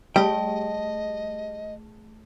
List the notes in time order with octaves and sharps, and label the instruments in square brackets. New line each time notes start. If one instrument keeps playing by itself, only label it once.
[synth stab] G3 [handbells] A3 G#4 A5 [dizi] D#5 [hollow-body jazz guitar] G5